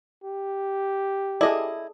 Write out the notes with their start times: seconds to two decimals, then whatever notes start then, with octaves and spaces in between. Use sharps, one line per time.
0.24 G4
1.41 E4 G#4 A4 D5 D#5